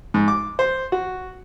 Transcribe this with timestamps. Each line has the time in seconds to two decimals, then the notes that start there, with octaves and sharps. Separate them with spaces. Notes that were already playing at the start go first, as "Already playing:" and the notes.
0.14 G#2
0.28 D6
0.59 C5
0.92 F#4